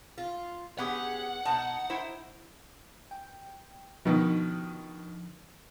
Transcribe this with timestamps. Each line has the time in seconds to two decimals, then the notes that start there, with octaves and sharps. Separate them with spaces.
0.18 F4
0.78 B3 C#4 G4 G#4 F#5
1.45 B2 D#4 A5
1.90 E4 C5
3.11 G5
4.05 B2 D3 D#3 F3